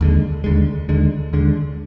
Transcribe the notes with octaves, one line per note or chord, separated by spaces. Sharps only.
D#2 D3 G#3
D#2 D3 G#3
D#2 D3 G#3
D#2 D3 G#3